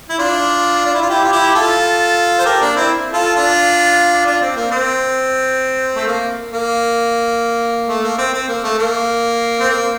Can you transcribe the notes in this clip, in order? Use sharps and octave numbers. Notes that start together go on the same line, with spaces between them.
E4
D4 F4
D4
E4
F4
E4 G4
F4
E4 G4
F4 A4
C5
G4 A#4
A#3 D4
C4 E4
F4 A4
D4 F4
D4 F4
C4
A#3
C4
A3
A#3
A#3
A3
A#3
C4
C4
A#3
A3
A#3
C4
A#3